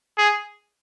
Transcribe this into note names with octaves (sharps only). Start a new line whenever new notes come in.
G#4